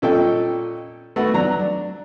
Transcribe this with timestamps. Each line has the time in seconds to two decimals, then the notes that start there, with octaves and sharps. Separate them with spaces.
0.02 A#2 C#4 A4 D#5 G5
1.16 A3 B3 F#4
1.34 F#3 D4 A#5
1.59 D4